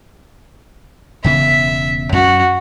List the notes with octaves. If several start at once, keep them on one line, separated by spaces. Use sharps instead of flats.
E1 C#3 B3 E5
F#2 C#4 F#4